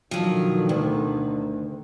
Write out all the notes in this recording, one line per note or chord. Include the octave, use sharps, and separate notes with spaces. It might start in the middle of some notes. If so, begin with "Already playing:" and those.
B2 D3 D#3 F3 F#3
D2